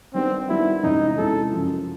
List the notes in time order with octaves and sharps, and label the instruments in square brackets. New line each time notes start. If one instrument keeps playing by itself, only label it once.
[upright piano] D#3 G3 B3 D4 G4 [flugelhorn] C4
[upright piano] D#3 G3 B3 D4 G4 [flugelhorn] E4
[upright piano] E2 C3 E3 G#3 C#4 [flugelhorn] D#4
[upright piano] E2 C3 E3 G#3 C#4 [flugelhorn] A4
[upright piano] F#2 C#3 F3